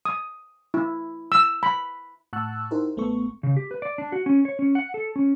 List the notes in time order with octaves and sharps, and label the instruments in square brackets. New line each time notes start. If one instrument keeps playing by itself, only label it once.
[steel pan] D#6
E4
E6
B5
[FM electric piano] A2 F#5 A5 C#6 E6 F#6
D#4 E4 G4 A#4 C5
A1 A3 B3 A4 C#6
[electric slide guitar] C#3
G4
B4
D5
D4
F#4
C#4
C#5
C#4
F#5
A4
C#4